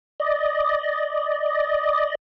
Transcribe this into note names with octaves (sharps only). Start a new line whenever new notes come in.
D5 D#5